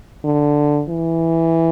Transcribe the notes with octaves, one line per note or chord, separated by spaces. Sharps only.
D3
E3